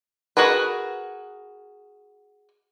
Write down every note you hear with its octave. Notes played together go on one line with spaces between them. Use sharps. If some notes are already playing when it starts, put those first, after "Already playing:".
F#4 G#4 A#4 B4